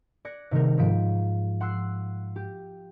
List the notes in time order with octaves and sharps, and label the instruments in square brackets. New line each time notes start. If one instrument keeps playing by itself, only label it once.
[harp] D5 F#6 G#6 A#6 C#7
C3 D#3 G3 A3 A#4
G#2 F3 B6 D7
F#5 C6 E6 F#6 C7
G4